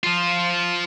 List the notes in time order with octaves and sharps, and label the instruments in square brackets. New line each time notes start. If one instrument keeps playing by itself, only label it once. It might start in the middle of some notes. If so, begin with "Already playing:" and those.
[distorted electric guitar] F3 F4